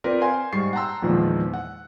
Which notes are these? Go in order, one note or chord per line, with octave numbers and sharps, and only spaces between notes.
C4 F4 A#4 B4 D5
C5 F5 G#5 C6
G#2 G3 C#6 A6 C7
F#5 G5 A5 A#5 C6 E6
E2 A#2 D#3 F3 G#3
F#5